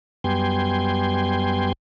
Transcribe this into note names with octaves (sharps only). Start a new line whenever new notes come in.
F#2 G3 B3 G5 G#5 C6